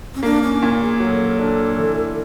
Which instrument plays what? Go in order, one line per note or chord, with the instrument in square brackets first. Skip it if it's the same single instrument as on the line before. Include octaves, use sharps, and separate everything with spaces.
[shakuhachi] C#4
[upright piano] A#3 [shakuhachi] D4
[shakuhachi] C#4
[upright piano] A#2
[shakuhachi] G#4
[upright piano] F#3 [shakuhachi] A4
[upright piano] D4
E3